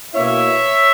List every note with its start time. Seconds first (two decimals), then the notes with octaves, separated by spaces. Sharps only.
0.14 B2 A#3 E4 C#5 E5